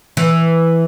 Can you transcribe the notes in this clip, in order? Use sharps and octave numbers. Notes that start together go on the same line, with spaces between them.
E3